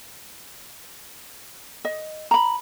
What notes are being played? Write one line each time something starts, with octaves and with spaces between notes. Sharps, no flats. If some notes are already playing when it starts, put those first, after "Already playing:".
D#5
A#5 B5